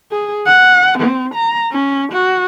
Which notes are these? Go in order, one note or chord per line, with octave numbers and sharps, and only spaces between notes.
G#4
F#5
C4
A#5
C#4
F#4